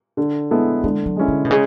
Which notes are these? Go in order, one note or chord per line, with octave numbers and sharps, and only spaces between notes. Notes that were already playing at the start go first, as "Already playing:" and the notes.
D3
G#3 B3 E4 A4
D3 G#3
F#3
G#3 C#4 E4
D3
B2
C#3 G#3